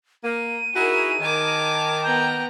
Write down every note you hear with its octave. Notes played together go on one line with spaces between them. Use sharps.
A#3 D#7
D#4 E4 F#4 G#4 A#4
D#3 A#4 G#5 A5 D6
B3 G5 A#5